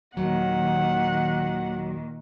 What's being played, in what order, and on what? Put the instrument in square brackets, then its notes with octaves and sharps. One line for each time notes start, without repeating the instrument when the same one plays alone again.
[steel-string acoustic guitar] D#2 F#3 [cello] A#2 D#3 [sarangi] F#5